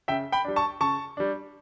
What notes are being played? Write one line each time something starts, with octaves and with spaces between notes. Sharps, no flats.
C#3 E5 G5
G5 B5
G3 D4
A5 C#6
C#3 A5 C#6
G3 D4